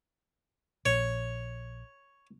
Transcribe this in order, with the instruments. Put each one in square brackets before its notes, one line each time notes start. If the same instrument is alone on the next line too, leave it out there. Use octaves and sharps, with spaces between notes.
[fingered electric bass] A#1 [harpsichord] C#5